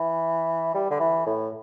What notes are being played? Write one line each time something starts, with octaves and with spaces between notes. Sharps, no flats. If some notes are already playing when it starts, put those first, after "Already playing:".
Already playing: E3
G3
D3
E3
A2